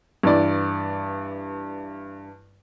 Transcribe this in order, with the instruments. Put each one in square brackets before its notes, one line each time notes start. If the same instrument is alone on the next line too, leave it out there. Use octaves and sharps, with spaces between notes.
[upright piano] G2 E3 D5